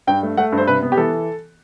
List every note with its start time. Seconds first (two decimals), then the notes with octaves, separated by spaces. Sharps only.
0.07 G2 G5
0.23 A3
0.37 A3 F#5
0.52 G2
0.58 C5
0.67 C3 B4
0.82 B3
0.92 G4
0.97 E3 A4